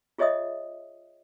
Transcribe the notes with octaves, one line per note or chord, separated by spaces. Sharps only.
F4 G#4 C#5 D#5 E5 D#6